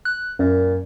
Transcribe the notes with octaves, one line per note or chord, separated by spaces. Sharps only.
F#6
F#2 A#2